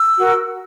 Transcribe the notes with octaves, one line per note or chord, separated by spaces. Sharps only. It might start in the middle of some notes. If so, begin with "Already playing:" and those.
Already playing: E6
F#4 A#4